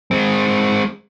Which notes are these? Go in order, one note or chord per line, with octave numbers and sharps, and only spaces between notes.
G#3 C4